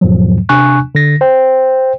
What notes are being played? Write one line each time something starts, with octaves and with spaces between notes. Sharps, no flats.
E2 G#2 B2 F3 F#3
C3 D4 G#5 C#6 F#6
D3 A#6
C5 G5